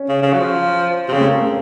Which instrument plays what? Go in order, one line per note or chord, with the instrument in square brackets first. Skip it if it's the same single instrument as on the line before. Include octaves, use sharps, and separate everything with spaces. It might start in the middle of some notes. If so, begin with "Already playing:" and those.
Already playing: [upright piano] C#4
[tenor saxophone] C#3
C#3
F#3
F3
C3
[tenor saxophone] C#3 [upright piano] C4
[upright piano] A3
A#3
C4